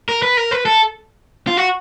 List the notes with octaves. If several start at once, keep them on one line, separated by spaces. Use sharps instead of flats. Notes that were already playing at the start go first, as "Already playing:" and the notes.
A#4
B4
A#4
B4
A4
F4
F#4